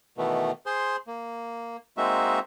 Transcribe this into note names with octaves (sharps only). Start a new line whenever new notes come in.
B2 D#3 E3 A3 B3
G#4 C5 C6
A#3
G#3 A#3 C4 D#4 F#4 E5